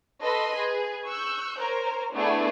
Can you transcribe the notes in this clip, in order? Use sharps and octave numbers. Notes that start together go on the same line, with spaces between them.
A4 B4 D#5 B5 C6
G#4 B4
C#6 E6 F#6 G6
A#4 C5 C#5
A3 B3 D4 E4 G#4